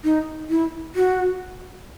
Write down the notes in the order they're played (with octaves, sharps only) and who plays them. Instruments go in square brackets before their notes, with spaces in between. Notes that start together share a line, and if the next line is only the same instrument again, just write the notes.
[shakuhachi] D#4
E4
F#4